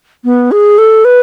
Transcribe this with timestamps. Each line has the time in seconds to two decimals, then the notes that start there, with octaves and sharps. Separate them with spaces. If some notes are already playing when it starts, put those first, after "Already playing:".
0.25 B3
0.52 G#4
0.78 A4
1.05 B4